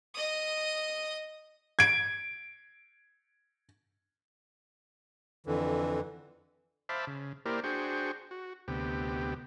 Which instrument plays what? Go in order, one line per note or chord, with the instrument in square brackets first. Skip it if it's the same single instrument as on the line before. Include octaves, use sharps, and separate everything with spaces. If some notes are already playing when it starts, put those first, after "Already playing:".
[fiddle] D#5 D#6
[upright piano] G#6 D7
[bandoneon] F2 D3 E3
[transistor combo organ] C5 E5 F5 A5 B5 D6
C#3
A#3 E4 G4 A#4 C5 D5
D4 F#4 G#4 C5 G5 C#6
F#4
D2 C3 B3 G4